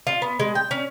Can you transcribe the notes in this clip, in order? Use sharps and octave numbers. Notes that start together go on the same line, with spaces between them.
F4
B3
G#3
G5
C#4